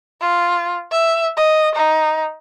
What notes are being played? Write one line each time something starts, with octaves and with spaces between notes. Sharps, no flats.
F4
E5
D#5
D#4